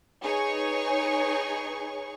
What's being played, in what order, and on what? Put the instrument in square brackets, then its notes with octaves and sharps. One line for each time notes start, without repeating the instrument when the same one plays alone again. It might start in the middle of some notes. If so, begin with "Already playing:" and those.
[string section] D#4 G#4 B4 C#5 G#5 C#6